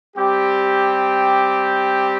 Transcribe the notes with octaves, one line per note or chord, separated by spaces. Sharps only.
G3 C4 G4